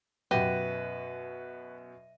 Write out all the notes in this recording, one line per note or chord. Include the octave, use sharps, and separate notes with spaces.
F#2 B2 G4 B4 E5 F#5 A#6 D#7